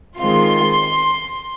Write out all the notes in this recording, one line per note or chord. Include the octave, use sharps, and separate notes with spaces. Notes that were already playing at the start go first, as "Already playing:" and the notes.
D#3 G#3 C4 F4 C6